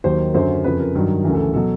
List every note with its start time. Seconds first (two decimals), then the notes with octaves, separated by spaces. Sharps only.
0.04 D#2 D#3 F#3 C5
0.34 F#2 D3 F#3 C5
0.64 F2 C#3 F3 B4
0.79 A#4
0.95 G2 D#3 F#3
1.24 D2 C#3 E3 A#4
1.34 A4
1.54 B2 F#3 A4